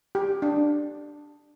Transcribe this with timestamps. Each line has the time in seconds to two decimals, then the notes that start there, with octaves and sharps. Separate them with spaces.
0.15 G4
0.42 D4